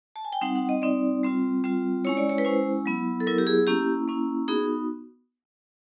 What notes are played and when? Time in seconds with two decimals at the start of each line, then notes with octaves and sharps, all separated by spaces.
0.16 A5
0.25 G#5
0.33 G5
0.41 G3 C4 D#4 F#5
0.55 F#5
0.69 D#5
0.82 G3 C4 D#4 D5
1.23 G3 C4 F4
1.64 G3 C4 F4
2.05 G#3 C#4 E4 C#5
2.17 D5
2.29 C#5
2.38 B4
2.45 G#3 C#4 E4 C5
2.86 F#3 B3 E4
3.20 A4
3.27 F#3 B3 E4 A#4
3.38 G4
3.47 G#4
3.67 A#3 C#4 E4 G4
4.08 A#3 C#4 E4
4.48 B3 D#4 F#4 G#4